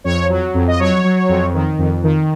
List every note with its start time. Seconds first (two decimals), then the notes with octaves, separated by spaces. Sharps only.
0.04 F2 C#5
0.29 F#3
0.54 F2
0.68 D#5
0.79 F#3 C#5
1.04 F#3
1.29 F2
1.54 D#3
1.78 F2
2.03 D#3